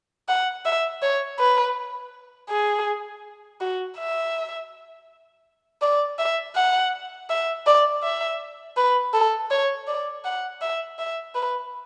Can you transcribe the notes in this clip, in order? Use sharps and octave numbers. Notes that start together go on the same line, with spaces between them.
F#5
E5
C#5
B4
G#4
F#4
E5
D5
E5
F#5
E5
D5
E5
B4
A4
C#5
D5
F#5
E5
E5
B4